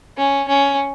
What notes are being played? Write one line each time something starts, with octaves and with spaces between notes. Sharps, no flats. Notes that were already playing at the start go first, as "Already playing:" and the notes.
C#4
C#4